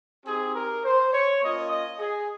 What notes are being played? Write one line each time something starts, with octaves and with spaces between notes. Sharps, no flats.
C4 D#4 G4 G#4
A#4
C5
C#5
A#3 C#4 F4 D#5
D#5
G#4